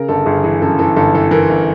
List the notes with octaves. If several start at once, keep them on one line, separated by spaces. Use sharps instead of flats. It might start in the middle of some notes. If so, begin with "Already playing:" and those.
Already playing: C#3 A#4
G1 A4
G1 G#4
E3 G#4
F#2 A4
E3 A4
G1 A4
E3 A4
E3 A#4
G1